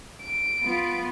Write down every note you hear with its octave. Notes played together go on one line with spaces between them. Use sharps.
D7
B3 F4